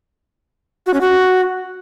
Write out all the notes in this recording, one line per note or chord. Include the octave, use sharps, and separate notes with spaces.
F#4
C#4
F#4